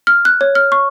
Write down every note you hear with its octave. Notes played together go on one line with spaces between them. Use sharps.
F6
F#6
C#5
F6
C#6